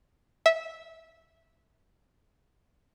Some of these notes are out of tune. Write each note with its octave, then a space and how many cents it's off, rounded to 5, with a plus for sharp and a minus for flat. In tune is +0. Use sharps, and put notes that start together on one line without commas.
E5 -15